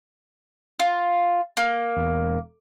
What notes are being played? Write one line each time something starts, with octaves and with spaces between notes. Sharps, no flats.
F4
A#3
E1